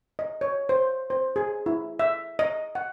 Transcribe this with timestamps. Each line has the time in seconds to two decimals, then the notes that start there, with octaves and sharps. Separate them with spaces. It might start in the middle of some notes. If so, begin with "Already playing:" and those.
0.19 D#5
0.41 C#5
0.69 C5
1.10 C5
1.36 G#4
1.66 E4
1.99 E5
2.39 D#5
2.75 F#5